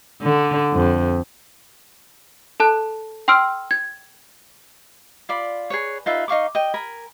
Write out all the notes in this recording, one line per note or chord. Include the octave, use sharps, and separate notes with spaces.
D3
F2
A4 A5 F#6
G5 C6 E6 F6 D7
G#6
F4 D5 B5
G#4 B4 C#5
D#4 F4 B4 E5
D#4 F5 C#6 D6
D#5 G5
A#4 G#5 B5